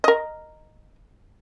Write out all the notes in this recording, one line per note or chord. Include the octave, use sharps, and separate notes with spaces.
A#4 D#5